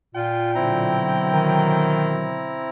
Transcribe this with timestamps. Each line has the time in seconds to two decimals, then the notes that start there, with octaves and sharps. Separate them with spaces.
0.15 A#2 F4 G5
0.55 B2 D3 F#3 C4 E4 A#5
1.34 D#3